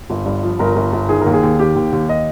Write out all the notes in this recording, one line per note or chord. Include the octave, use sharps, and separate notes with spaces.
G1
G2
F3
G1 A#4
G1
G1
D#3 G#4
A#4
D#2
G#4
D#2
D#3 G4
D#2
D#2
D#5